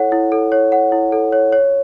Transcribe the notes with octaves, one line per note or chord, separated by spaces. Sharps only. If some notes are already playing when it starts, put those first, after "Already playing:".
Already playing: E4 A4 C#5 F#5
E4
A4
C#5
F#5
E4
A4
C#5
C#5